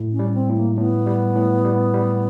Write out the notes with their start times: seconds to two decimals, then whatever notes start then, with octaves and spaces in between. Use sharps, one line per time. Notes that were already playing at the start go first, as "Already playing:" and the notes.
Already playing: A2
0.13 C#4
0.19 G3
0.34 C4
0.49 A2
0.56 A#3
0.77 A2 B3
1.07 G3
1.36 A2
1.65 G3
1.94 G3